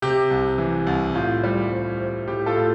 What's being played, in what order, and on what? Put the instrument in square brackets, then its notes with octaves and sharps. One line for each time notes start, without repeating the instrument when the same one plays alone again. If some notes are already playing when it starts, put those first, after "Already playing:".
[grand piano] C3 G4
C2
E3
C2
A2 F4
G3
C4
C4
A2 G4
F4 A4
A2